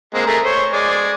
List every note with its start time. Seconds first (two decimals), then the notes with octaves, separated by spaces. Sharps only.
0.14 G#3 A#3 C4
0.27 A3 G#4 A#4
0.44 C5 C#5
0.73 G#3 D5 G#5